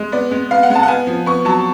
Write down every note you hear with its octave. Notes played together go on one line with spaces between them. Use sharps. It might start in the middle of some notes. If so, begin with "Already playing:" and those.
Already playing: G#3
B3 D5
G#3
B3 F5
F#5
G#3
A5
F#5
B3 G#5
F3
B3 C#6
F#3 A5